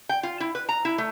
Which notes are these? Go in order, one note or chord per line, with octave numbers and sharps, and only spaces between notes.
G5
F4
E4
B4
A#5
E4
A3